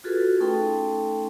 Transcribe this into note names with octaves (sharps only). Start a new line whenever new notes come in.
F4 F#4 G#4 A4 B4
A3 C#4 D#4 A4 G5 C6